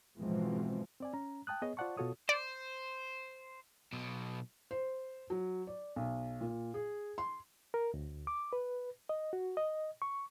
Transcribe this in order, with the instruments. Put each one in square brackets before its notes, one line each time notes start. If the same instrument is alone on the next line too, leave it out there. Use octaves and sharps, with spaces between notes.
[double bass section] G#2 B2 E3 F3 G#3 C4
[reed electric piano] C4 D5 G#5
C#4 A#5
G5 A5 D#6 F#6
B3 G#4 C#5 D#5
F4 C5 D5 F#5 A5 C#6
B2 F4 F#4 A4 C#5 D#6
[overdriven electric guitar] C5 [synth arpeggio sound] D5
[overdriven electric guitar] B1 B2
[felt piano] C5
F#3
D5
B1
A#2
G#4
C6
[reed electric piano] A#4
D2
D6
B4
D#5
F#4
D#5
C#6